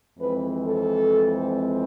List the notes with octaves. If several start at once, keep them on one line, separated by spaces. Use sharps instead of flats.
F2 E3 G#3 C4 B4
A4